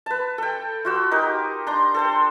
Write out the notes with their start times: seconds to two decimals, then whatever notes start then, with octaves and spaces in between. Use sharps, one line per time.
0.06 B4 A5
0.38 A4 G5
0.85 F4 F#4 E6
1.11 D#4 G4 A#4
1.67 D4 A#5 C6
1.94 A4 C5 G5